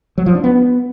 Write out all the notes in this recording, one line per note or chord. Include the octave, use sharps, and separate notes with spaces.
F#3
F3
D4
B3